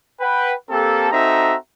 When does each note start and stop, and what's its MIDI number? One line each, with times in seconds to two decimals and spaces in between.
0.21 0.54 71
0.21 0.54 78
0.21 0.54 79
0.70 1.08 58
0.70 1.08 60
0.70 1.08 67
0.70 1.08 69
1.12 1.55 60
1.12 1.55 63
1.12 1.55 66
1.12 1.55 69
1.12 1.55 76
1.12 1.55 82